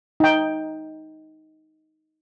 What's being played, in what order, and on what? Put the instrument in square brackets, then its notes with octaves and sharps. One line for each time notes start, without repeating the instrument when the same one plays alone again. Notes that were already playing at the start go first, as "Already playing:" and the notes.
[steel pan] D#4 G5